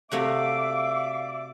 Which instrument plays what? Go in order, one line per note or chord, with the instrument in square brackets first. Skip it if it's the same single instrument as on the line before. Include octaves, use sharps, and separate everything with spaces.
[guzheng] C3 A3 F#4 [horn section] D5 E5 [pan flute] F5 [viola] D6